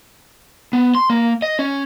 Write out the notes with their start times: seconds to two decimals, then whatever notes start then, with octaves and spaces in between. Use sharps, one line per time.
0.73 B3
0.95 C6
1.10 A#3
1.42 D#5
1.59 C#4